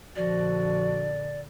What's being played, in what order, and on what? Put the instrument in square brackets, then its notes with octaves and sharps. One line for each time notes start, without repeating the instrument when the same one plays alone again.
[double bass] A#1 D3 [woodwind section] F3 F#4 [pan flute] D5